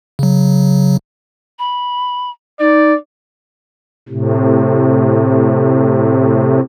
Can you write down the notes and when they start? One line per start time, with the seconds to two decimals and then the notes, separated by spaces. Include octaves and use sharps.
0.19 C#3 F#3
1.59 B5
2.59 D#4 D5
4.09 A2 C3